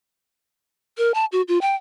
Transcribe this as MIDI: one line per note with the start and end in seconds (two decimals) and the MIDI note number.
0.98 1.12 70
1.14 1.25 81
1.32 1.42 66
1.48 1.58 65
1.61 1.75 79